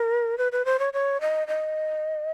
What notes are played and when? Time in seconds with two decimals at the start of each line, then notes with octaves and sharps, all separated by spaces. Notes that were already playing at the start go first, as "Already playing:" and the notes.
Already playing: A#4
0.38 B4
0.52 B4
0.65 C5
0.79 C#5
0.93 C#5
1.21 D#5
1.48 D#5